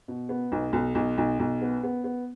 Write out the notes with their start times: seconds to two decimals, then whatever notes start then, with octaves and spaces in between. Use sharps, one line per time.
0.08 B2
0.29 B3
0.52 B1
0.73 B1
0.95 B1
1.18 B1
1.40 B1
1.62 B3
1.83 B3
2.04 B3